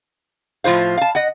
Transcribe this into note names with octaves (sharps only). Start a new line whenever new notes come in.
A2 F3 F4 C5 F5
F5 A5
D#5 F#5